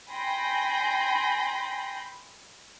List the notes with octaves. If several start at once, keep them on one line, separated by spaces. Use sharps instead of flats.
G5 G#5 B5 C6 G6 A#6